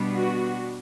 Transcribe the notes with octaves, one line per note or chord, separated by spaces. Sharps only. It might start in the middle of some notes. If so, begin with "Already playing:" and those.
Already playing: B2 G3 B3 D4
F#4